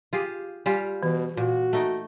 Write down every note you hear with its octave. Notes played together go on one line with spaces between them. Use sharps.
F4 G4 G#4
G3 F4 G4 G#5
B2 E3
A#2 F#4
A3 D#4 G5